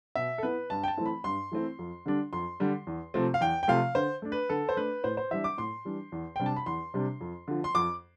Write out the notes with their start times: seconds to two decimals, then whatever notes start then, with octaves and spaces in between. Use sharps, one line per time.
0.15 B2 E5
0.38 A4
0.43 B3 E4 B4
0.70 G2 A5
0.83 G5
0.88 A5
0.98 E3 A3 C4 E4
1.06 B5
1.24 G2 C6
1.52 E3 A3 C4 E4
1.79 F2
2.06 D3 G3 D4
2.33 F2 C6
2.60 D3 G3 D4
2.87 E2
3.14 C3 F3 A3 C4
3.34 F5
3.41 E2 G5
3.63 G5
3.68 C3 F3 A3 C4 F5
3.95 D3 C5
4.22 A3 D4
4.32 B4
4.49 D3 A4
4.69 C5
4.77 A3 D4 B4
5.04 A2 C5
5.17 C5
5.31 E3 G3 D4 E5
5.44 D6
5.58 A2 C6
5.85 E3 G3 D4
6.12 E2
6.36 C3 G3 D4 G5
6.46 A5
6.56 B5
6.66 E2 C6
6.94 C3 G3 D4
7.21 F2
7.48 D3 F3
7.64 C6
7.75 F2 D6